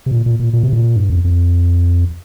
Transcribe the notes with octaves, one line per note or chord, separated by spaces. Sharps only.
C3
A#2
A#2
A#2
A#2
C3
A#2
G2
F2
F2